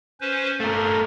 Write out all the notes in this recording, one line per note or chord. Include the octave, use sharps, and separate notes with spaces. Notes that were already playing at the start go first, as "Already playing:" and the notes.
C#4 B4 C5
G2 A3 A#4